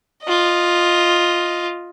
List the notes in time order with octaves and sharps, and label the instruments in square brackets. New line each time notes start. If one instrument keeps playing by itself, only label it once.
[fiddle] F4 D#5